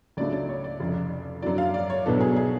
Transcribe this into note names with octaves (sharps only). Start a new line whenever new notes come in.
C#2 C#3 F#3 A3 D4 D5
D5
C#5
D5
F1 F2 C#3
F#2 D3 F#3 D5
F5
D5
C#5
B1 B2 F#3 B3 D4 A4
G#4
G#4